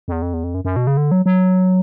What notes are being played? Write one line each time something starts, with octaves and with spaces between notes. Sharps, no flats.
F2
E2
F2
E2
F2
F#2
F#2
B2
C#3
D3
F#3
F#3